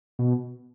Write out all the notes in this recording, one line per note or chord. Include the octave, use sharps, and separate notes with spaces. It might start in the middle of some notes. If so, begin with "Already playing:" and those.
B2